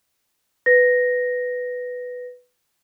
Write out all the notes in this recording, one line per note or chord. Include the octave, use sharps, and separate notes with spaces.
B4 A#6